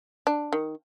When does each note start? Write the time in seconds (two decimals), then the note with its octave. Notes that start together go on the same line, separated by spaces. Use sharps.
0.27 D4
0.53 D#3